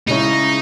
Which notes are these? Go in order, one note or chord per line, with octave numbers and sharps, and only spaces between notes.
C#3 G#3 C#4 D#4 E4